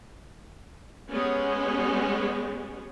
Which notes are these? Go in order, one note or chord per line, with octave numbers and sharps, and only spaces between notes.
G#3 B3 C#4 G4 G#4